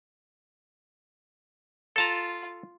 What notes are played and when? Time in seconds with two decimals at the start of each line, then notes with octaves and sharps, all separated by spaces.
1.96 F4 A4 A5 A#5